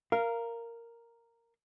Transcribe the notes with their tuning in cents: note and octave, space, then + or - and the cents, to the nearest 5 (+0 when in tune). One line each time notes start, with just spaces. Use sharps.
A#4 -5 F5 -15